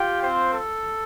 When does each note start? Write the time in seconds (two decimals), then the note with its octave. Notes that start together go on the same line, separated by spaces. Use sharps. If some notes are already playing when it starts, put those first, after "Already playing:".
Already playing: F4 G4 G5
0.23 C4 C5
0.54 A4